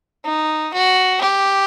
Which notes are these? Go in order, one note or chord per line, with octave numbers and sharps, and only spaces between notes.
D#4
F#4
G4